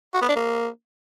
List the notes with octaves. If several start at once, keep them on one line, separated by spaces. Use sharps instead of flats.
F#4
B3
D4
A#3